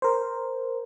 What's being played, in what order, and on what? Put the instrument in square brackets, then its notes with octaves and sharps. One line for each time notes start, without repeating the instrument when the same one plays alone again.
[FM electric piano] A#4 C5